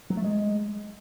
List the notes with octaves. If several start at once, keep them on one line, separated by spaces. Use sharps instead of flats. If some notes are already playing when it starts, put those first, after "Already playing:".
F#3
A3
G#3